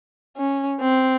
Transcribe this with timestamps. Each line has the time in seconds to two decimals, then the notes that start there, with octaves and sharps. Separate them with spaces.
0.37 C#4
0.80 C4